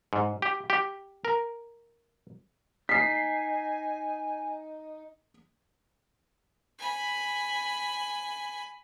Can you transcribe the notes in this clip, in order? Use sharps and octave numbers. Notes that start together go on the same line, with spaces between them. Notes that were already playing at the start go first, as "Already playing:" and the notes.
G#2
G4
G4
A#4
D#4 G#5 B6 C7
G#5 B5